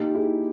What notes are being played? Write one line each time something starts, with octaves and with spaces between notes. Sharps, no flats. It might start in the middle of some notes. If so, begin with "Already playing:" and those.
Already playing: A#2 D#4 G4
E4 G#4